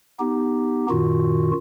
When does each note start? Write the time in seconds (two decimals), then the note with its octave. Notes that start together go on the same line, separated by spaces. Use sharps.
0.19 B3 D#4 G4
0.90 F#2 A#2 D#3 F4 F#4